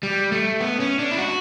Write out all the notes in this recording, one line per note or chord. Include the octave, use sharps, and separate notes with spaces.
G3
A3
B3
C#4
D4
E4
F#4